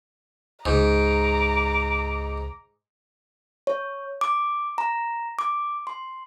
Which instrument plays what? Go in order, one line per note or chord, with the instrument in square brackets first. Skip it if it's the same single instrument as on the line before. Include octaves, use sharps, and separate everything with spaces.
[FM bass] C#2 [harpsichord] G#2 [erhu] A#5 [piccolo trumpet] D6
[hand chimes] C#5
D6
A#5
D6
C6